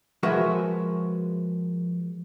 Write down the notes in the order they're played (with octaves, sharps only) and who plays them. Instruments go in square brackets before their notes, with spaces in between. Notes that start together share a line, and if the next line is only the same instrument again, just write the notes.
[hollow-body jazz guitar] F3 G#3 F#4 A#4 B4 E5